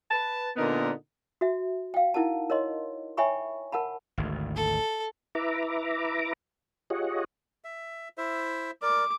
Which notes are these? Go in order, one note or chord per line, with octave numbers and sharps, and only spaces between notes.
B4 A5
A#2 D3 B3 D#4 A#4
F#4 E5
F5 G5
D#4 E4 A#4 F#5 A5
A#4 C#5 D#5 C6
C#5 E5 G5 G#5 B5 C#6
A#4 F#5 A5 B5
G#1 D2
A4
E4 B4 E5 A#5 D6
F4 G4 G#4 C#5 D#5 F#5
E5
E4 C5 E5
A#4 D5 D6